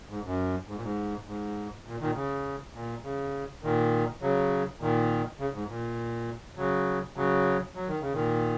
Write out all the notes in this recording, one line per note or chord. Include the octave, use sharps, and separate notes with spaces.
G#2
F#2
G#2
A#2
G#2
G#2
A#2
A#2 D#3
C#3
A#2
C#3
A#2 D#3
C#3 F#3
A#2 D#3
C#3
G#2
A#2
C#3 F#3
C#3 F#3
F#3
D#3
C#3
A#2 D#3